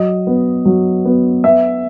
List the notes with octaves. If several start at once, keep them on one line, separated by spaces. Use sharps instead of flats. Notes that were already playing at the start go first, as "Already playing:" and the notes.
Already playing: F#3 D#5
B3
F#3
B3
B3 E5